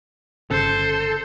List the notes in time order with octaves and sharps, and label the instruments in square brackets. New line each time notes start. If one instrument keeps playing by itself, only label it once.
[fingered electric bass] G1 C#3 [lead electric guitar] A4 [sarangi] C5